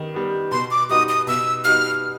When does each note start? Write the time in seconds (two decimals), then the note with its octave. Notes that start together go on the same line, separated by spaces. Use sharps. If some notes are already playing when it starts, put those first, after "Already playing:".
Already playing: D#3 G3 B3
0.14 G3 B3
0.52 B2 C6
0.71 D6
0.89 G3 B3 D#4 F#4 D#6
1.09 D#6
1.27 B2 E6
1.65 G3 B3 D#4 F#4 F6